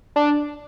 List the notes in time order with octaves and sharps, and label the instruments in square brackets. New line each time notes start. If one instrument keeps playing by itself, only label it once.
[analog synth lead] D4